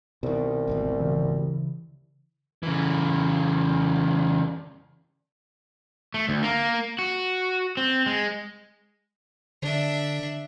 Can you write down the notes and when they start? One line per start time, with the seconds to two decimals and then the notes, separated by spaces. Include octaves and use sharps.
0.23 C2 B2 D#3
0.67 G#1 D2 B2
1.00 C#3 E3
2.63 C#3 E3
6.14 A3
6.29 D2
6.43 A#3
6.99 F#4
7.77 C4
8.06 G#3
9.62 D3 D4 E5